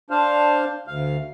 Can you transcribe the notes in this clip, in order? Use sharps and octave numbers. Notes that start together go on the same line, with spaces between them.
D4 C5 F5
D2 F5